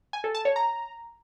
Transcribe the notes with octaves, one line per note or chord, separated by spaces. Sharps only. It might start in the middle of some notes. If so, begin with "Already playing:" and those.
G#5
A4
A5
C#5
A#5